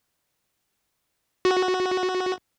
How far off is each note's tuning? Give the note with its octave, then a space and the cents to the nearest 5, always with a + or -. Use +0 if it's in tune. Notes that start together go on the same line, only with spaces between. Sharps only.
F#4 -5